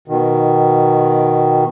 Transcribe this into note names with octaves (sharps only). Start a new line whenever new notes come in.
B2 D#3